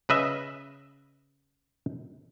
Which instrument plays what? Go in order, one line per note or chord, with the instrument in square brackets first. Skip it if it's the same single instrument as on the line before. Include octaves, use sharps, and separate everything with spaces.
[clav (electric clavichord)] C#3 B4 D#5 E5